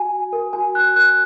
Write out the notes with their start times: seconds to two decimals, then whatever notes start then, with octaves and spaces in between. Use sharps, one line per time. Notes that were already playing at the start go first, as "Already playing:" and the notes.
Already playing: F#4 G#5
0.10 F#4
0.33 A#4
0.53 F#4 G#5
0.75 F#4 F#6
0.96 A#4 F#6